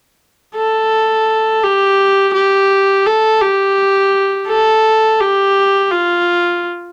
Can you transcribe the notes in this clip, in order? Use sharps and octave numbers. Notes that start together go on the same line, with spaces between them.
A4
G4
G4
A4
G4
A4
G4
F4